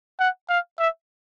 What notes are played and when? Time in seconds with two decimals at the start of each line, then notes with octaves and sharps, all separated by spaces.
0.20 F#5
0.49 F5
0.79 E5